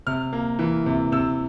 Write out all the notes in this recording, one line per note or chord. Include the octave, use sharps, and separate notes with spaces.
C3 F6
A#3
E3
C3
C3 E6